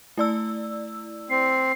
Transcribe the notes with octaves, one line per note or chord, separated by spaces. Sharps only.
A3 E4 D5 E6
C4 C7